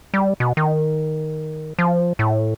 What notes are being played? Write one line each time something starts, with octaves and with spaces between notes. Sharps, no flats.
G3
B2
D#3
F3
A2